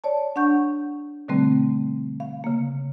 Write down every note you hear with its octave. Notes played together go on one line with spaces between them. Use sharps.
C#5 D5 A5
D4 F#5 C#6 G6
B2 D3 G3 A3 C4
F5
C#3 A#3